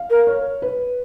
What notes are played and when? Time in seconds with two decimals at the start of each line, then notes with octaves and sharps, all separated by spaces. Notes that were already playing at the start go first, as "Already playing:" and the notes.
Already playing: F5
0.10 A#4
0.27 C#5
0.62 B4